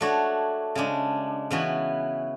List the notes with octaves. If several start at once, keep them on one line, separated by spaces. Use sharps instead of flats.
A3 D4 F#4 C#5
C#3 G#3 D4
C#3 E3 B3 F#4 B4